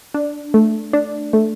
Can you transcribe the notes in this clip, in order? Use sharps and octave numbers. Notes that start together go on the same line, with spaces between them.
D4
A3
D4
A3